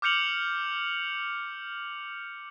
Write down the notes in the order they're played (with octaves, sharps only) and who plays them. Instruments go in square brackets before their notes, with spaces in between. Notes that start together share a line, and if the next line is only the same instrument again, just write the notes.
[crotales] D6 F6 G6 C#7 F7 F#7